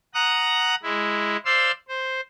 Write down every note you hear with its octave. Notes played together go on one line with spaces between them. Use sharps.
F#5 A#5 D#6 F#6
G#3 E4
C5 D5 F5 C6 E6
C5